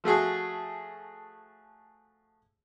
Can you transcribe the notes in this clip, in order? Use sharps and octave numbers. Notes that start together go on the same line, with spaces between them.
F3 A3 F#4 G#4